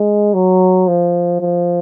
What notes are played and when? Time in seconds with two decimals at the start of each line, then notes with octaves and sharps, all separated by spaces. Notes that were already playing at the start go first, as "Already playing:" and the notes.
Already playing: G#3
0.34 F#3
0.88 F3
1.40 F3